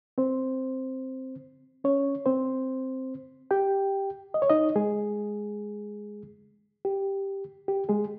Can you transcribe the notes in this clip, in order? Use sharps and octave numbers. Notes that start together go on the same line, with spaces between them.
C4 C5
C#4 C#5
C4 C5
G4 G5
D#5
C#5
D#4 D#5
G#3 G#4
G4
G4
G#3 G#4